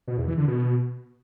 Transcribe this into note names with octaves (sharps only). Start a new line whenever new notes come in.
B2
E2
E3
D3
B2